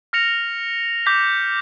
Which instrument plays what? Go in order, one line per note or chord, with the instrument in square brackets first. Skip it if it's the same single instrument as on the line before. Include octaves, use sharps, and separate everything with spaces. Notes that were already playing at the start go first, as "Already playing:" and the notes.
[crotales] F6 A#6 C#7 F7
D6 G6 B6